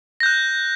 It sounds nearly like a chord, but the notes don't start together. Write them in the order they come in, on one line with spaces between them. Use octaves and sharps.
A#6 G6 F#6